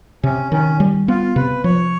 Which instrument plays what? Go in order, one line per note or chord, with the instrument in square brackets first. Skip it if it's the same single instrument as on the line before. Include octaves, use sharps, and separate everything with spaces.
[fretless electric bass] C3 [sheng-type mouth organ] C#4
[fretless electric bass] D#3 [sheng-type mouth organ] C#4
[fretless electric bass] G3
[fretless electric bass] B3 [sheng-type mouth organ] F4
[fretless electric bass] C3 [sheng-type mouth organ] B4
[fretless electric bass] F3 [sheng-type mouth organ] C#5